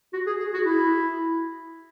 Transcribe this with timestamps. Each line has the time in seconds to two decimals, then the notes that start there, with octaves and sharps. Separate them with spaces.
0.13 F#4
0.26 G#4
0.40 G#4
0.54 F#4
0.66 E4